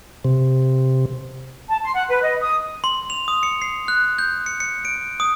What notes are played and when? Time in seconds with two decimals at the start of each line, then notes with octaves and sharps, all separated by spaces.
0.25 C3
1.68 A5
1.82 C6
1.95 F#5
2.09 B4
2.23 D#5
2.41 D#6
2.84 C6
3.10 F7
3.28 D#6
3.43 C#7
3.62 C7
3.88 F#6
4.19 G6
4.46 C#7
4.60 C#7
4.85 D7
5.20 D#6